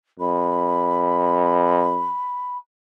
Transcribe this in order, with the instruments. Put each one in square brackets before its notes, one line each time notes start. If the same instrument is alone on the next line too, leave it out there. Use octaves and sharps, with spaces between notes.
[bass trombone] F2 [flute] B5